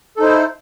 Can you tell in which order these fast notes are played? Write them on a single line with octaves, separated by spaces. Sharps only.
A4 D#4 C5 E4